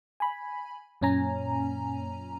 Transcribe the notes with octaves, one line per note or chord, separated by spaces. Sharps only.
G#5 B5
F#2 A#2 C#4 G#5 A#5